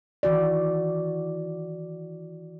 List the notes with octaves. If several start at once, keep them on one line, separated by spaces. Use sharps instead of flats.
D#3 E3 F#4 D5